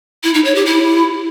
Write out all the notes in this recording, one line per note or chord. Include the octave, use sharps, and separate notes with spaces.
E4
D#4
C#5
G4
E4